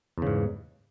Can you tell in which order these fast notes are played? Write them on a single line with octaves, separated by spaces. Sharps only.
E2 C#3 G#2